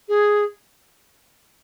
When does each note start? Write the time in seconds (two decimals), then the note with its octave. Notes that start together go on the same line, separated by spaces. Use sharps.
0.08 G#4